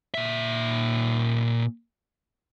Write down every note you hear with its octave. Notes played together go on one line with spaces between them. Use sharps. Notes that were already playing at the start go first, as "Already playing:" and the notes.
A#2 E5